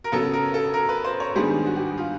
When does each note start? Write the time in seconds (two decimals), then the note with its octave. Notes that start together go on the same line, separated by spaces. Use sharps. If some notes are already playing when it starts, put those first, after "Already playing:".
0.04 A#4
0.12 C#3 F#3 B3 A4
0.33 A#4
0.54 A4
0.74 A#4
0.89 B4
1.04 C5
1.20 C#5
1.35 G#2 D#3 G3 B3 D4 G#4
1.66 F#4
1.76 G4
1.86 F#4
1.97 F4